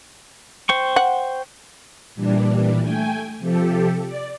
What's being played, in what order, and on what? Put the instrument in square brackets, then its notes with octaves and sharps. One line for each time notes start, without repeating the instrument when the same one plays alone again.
[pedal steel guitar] C5 G5 C#6
[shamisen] F#5
[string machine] A#2 E3 G3 D4
A3 G5 G#5
C3 F3 G4 A4
D5